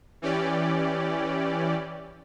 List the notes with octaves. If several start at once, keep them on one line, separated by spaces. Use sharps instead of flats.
E3 C#4 G4 D5